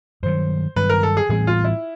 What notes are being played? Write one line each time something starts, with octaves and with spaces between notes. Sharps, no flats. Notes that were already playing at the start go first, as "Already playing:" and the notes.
G2 D#3 F#3 C5
G2 D#3 F#3 B4
A#4
A4
G#4
A2 E3 G3 C4 G#4
F4
E4